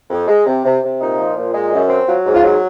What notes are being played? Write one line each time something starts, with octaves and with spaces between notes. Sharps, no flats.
F2
G#3
C3
C3
C3
A#2 D#4
F3
A#2
G#3
F#2
C4
F#3 F4
G#2
F4
F#3